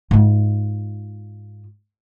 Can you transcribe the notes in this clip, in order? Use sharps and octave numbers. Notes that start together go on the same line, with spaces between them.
G#2 F4